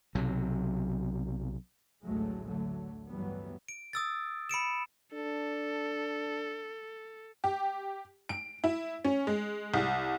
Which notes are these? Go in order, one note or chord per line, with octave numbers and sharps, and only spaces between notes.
B1 C3 F#3
A1 D2 A2 F#3 G#3 A3
D3 F#3 A3
G2 E3 F#3 G3 A3 B3
D7
D#6 E6 A6
B5 C#7 D7 E7
D4 A4
G4
D7
E4
C#4
G#3
C2